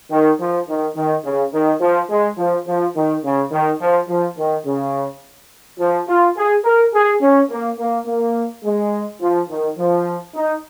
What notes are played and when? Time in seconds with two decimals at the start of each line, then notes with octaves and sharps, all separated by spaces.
0.11 D#3
0.39 F3
0.68 D#3
0.96 D#3
1.25 C#3
1.53 D#3
1.81 F3
2.10 G#3
2.38 F3
2.67 F3
2.96 D#3
3.24 C#3
3.52 D#3
3.81 F3
4.09 F3
4.38 D#3
4.65 C#3
5.79 F3
6.08 F4
6.37 G#4
6.64 A#4
6.94 G#4
7.21 C#4
7.50 A#3
7.79 A#3
8.07 A#3
8.64 G#3
9.21 F3
9.49 D#3
9.77 F3
10.35 D#4